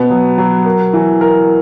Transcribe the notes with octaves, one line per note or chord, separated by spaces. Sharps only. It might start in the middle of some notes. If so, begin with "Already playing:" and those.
Already playing: B2 B3
F#3
F#3
A#4
E3
A#4